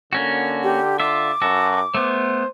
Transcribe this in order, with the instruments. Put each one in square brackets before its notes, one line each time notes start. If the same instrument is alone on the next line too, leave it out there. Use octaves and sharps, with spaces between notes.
[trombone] D3 [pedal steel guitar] A#3 C#4 F#4
[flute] G4
[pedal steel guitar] F4 E5 [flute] D6
[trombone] F#2 [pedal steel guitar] F#4 A4
[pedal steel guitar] A3 B3 [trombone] C5